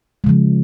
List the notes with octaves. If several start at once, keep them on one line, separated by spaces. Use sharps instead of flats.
C#3 F3 G#3